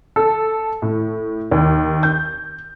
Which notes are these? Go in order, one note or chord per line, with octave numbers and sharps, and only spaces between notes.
A4
A2
D#2
G6